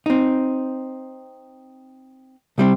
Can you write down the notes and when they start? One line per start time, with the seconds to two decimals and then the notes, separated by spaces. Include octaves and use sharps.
0.06 C4 D#4
2.58 C2 G3 C4